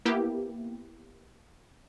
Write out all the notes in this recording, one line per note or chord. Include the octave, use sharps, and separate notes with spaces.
A#3 B3 E4 G4